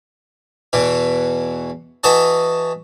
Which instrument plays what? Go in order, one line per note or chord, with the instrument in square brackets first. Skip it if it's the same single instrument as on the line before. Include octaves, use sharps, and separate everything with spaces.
[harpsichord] E2 B2 E3
E3 F#4 A4 D#5 A5